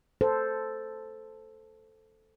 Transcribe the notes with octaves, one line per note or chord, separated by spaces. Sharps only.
A4 C5